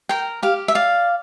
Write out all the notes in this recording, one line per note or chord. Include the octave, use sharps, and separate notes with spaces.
A#4 G5
G4 F5
E5
D5 F5